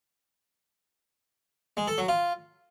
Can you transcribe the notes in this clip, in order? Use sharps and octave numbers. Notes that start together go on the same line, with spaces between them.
G#3
A4
F#3
F4